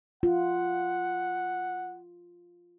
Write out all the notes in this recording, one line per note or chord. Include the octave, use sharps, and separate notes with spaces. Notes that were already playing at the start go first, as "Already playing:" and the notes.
F4 F#5